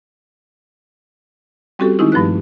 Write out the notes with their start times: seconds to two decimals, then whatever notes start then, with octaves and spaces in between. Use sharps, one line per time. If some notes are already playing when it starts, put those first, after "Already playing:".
1.79 G3 C4 C#4 F#4 G4 A4
1.99 D#3 G#3 C4 C#4 D#4 E4
2.12 G2 F3 A3 B4 F#6